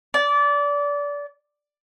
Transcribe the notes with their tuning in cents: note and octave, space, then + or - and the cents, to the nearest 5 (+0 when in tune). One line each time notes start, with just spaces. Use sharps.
D5 -25